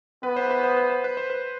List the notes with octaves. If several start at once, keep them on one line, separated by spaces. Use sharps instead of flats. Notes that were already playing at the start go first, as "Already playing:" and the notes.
B3 B4
C5
B4
C5
B4
C5
B4
C5
B4